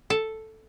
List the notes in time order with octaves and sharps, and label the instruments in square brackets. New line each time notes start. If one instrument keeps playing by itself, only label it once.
[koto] A4